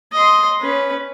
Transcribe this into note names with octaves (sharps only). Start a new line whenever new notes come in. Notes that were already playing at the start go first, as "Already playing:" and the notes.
D#5 C6
C#4 B4